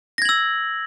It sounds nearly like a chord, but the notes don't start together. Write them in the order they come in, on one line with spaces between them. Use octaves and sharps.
A#6 G#6 F#7 E6